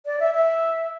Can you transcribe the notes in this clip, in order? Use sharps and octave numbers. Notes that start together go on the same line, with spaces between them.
D5
E5
E5